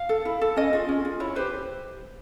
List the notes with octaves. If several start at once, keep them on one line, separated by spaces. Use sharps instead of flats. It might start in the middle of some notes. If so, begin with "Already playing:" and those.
Already playing: F5
A4
E4
A4
C#4 D#5
F4 G#4
C#4
F4 G#4
E4 C#5
G4 B4 C5